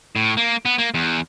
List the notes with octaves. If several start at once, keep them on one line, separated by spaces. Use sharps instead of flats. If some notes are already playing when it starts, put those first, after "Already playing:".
A2
A#3
B3
A#3
E2